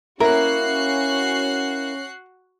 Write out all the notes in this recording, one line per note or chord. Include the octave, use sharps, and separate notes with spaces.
A#3 C#4 E4 F#4 A#4 F#6 C7